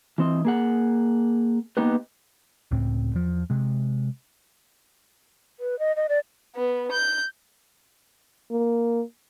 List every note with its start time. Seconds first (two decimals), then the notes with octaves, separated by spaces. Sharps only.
0.18 E3 C4 D#5
0.45 A#3 G#4 F#5
1.77 A#3 B3 D#4 G4 B4
2.71 C#2 A2 C4
3.13 E2 F3
3.50 C3 G#3
5.60 B4
5.79 D#5
5.96 D#5
6.09 D5
6.56 B3
6.92 G6
8.51 A#3